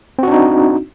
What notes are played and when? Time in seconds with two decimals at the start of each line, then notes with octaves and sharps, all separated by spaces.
0.19 C4
0.23 F#4
0.28 D4
0.32 D#4